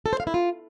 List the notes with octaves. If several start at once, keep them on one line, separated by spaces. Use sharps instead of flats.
A4
C5
F5
E4
F4